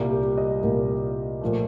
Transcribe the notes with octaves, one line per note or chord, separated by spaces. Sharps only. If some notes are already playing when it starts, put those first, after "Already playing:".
Already playing: C2 A#2 G3 A#3
G4
D#5
C2 A#2 G3 A#3
A#2 F3 A3